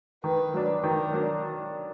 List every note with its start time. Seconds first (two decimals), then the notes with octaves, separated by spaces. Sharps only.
0.23 D#3 B4
0.54 F#3 D4
0.84 D#3 A#4
1.13 F#3 D4